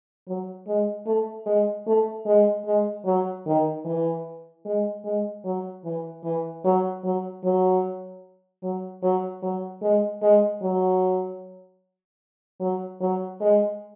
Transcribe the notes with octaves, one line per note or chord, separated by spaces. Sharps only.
F#3
G#3
A3
G#3
A3
G#3
G#3
F#3
D#3
E3
G#3
G#3
F#3
E3
E3
F#3
F#3
F#3
F#3
F#3
F#3
G#3
G#3
F#3
F#3
F#3
G#3